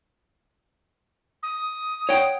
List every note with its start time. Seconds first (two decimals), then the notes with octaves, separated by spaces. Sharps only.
1.43 D#6
2.09 C#5 F#5 G5